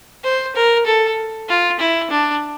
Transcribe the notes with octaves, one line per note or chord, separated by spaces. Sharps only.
C5
A#4
A4
F4
E4
D4